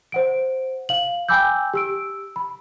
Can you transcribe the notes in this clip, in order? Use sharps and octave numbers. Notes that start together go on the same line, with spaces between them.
C5 F#5 D7
F5 F#7
G5 G#5 B5 D6 E6 G6
G4 E6 D7
B5